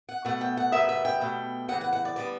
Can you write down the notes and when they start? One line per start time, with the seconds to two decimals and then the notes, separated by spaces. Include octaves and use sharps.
0.09 F#5
0.25 B2 A3 F#5
0.41 G5
0.57 F#5
0.72 F#2 C#3 G3 B3 E5
0.89 E5
1.05 G5
1.21 B2 A3
1.68 E2 C#3 E3 F#5
1.81 F#5
1.93 F#5
2.05 D5
2.16 D3 G3 B3 D5